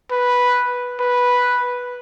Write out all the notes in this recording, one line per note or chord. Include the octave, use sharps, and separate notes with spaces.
B4
B4